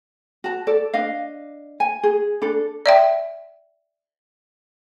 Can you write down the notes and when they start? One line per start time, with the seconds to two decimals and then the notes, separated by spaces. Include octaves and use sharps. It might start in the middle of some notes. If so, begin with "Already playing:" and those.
0.44 F#4 A5
0.67 A4 D5
0.93 D4 D#5 F5
1.80 G#5
2.03 G#4
2.42 D4 A4
2.86 D5 E5 G5